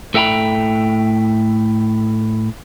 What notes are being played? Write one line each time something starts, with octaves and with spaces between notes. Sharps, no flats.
A2 A4 E5 G5 A#5 B5